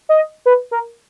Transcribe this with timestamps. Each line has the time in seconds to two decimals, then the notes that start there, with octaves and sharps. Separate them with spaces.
0.09 D#5
0.46 B4
0.71 A#4